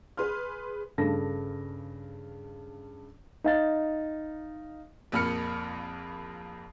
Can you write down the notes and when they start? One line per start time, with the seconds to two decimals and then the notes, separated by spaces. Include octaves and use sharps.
0.17 G#4 B4 C6 F6
0.98 G2 C#3 A4 A#6
3.44 D#4 F5 A6
5.12 A#1 F2 A#3 B5 F6 C#7